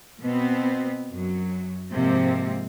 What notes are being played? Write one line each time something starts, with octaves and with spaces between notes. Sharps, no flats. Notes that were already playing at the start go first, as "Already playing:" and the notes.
B2 B3 C4
F#2 F#3
G#2 C3 F3 A#3 C4